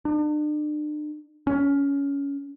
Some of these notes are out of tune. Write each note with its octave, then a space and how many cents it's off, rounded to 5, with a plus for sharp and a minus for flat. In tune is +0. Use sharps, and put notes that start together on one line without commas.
D4 +40
C#4 +20